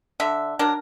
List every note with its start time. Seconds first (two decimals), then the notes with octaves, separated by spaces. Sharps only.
0.20 D3 E5
0.59 F#3 D4 A#4